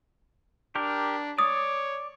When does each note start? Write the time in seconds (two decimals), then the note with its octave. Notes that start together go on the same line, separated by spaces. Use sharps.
0.76 D4 G4 A#4
1.39 C#5 D5 D#6